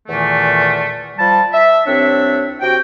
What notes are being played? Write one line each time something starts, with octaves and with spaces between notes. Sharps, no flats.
E2 A#2 D#3 E3 A3
F3 G3 A5
E5
C2 C4 D4 C#5 E5
C3 F#4 G5